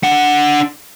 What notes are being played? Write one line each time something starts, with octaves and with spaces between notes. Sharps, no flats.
D4 F#5